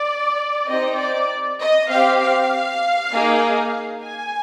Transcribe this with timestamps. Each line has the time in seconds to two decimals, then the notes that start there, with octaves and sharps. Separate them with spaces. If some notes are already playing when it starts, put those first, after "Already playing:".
Already playing: D5
0.68 C4 D#4 G4 D#5
0.99 D5
1.60 D#5
1.91 C4 G4 F5
2.20 F5
3.13 A#3 D#4 G#4
4.03 G#5